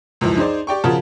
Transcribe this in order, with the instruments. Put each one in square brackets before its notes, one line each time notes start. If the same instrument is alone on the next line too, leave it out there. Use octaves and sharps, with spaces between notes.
[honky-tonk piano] C#2 F#2 E3 F3
D#4 G#4 C5 D5
G4 D5 G5 C#6
C#3 F3 F4 F#4 A#4 A5